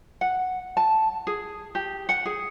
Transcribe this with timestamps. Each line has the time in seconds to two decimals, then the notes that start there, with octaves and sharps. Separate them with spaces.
0.21 F#5
0.77 A5
1.27 G#4
1.75 G4
2.09 F#5
2.26 G#4